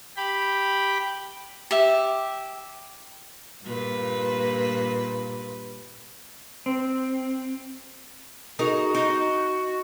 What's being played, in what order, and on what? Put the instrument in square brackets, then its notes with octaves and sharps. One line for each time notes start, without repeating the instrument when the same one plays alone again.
[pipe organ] G4 G5 B5
[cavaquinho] G4 E5
[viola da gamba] G2 A#2 B4
[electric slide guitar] C4
[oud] D#4 G#4 A#4 [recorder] F#4
[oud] D#4